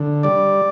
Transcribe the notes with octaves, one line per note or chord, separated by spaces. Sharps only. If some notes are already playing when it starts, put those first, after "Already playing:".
Already playing: D3
G3 D5